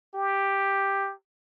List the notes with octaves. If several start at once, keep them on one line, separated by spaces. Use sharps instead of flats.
G4